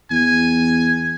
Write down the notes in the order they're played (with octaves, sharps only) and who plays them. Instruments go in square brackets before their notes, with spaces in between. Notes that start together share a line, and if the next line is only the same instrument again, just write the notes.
[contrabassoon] E2 [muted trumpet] G#5